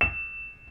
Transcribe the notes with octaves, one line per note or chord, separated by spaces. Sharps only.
E7